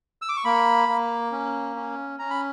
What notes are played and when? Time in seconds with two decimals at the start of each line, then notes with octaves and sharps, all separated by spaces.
0.22 E6
0.29 D6
0.37 C#6
0.45 A#3 B5
0.89 A#3
1.32 C#4
1.76 C#4
2.19 C#4 A#5
2.30 B5